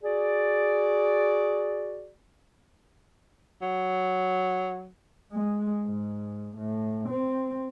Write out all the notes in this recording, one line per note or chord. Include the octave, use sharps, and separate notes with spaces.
F#4 G#4 D5
F#3
G#3
G#2
A2
C4